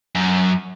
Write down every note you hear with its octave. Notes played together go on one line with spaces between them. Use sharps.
F#2